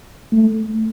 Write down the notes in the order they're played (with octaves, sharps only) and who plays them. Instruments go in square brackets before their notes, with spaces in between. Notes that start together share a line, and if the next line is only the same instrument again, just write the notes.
[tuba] A3